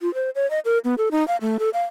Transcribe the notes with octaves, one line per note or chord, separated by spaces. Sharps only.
F4
C5
C#5
D#5
A#4
B3
A4
D#4
F5
A3
A4
F5